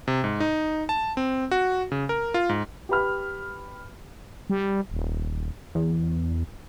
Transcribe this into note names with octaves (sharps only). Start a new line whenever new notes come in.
C3
G#2
D#4
A5
C4
F#4
C#3
A#4
F4
G#2
G4 B4 B5 F6
G3
D#1
E2